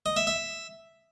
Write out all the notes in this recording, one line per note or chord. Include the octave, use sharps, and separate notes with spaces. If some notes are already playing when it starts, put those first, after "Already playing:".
D#5
E5
E5